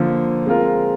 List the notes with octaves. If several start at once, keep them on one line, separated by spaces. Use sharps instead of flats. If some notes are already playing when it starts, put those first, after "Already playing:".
Already playing: D3 F3 A#3
G#3 C4 F4 A#4